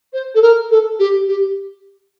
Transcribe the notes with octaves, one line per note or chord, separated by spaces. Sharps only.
C5
A4
A#4
A4
G4
G4